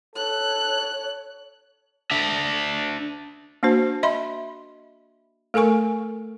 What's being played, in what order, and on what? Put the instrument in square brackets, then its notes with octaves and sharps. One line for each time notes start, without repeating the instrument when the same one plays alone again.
[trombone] A4 [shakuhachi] C#5 [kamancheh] F#6
[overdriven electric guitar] D4 E5
[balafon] A#3 D4 F#4 C5
D#5 E5 B5 C6
A3 A4 A#4 G#5 C#6